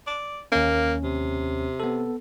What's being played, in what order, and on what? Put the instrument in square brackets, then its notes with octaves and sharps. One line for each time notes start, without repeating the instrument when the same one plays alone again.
[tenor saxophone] D5
[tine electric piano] D#2 C#4 [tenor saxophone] A#3
[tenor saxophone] C3
[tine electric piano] B3 A4